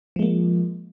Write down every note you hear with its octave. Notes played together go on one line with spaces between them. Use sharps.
F3 G#3 A#3